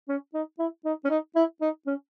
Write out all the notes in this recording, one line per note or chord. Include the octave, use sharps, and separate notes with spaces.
C#4
D#4
E4
D#4
C#4
D#4
E4
D#4
C#4